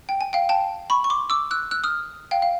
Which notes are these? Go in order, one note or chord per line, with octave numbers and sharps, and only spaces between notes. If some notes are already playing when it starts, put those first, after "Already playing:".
G5
G#5
F5 G5
G5 A5
B5 C#6
C#6
C6 D6
D6 E6
E6 F#6
E6 F#6
D#6 F6
F5 G5
F5